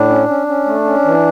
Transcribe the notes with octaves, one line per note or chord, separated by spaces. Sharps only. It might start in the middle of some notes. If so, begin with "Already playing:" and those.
Already playing: A2 D4
C#4
C#4
C#4
A3
C#4
E3